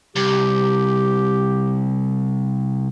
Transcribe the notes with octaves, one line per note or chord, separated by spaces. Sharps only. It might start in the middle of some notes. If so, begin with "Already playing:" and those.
C2 G4